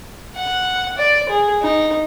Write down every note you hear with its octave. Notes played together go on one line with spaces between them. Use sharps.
F#5
D5
G#4
D#4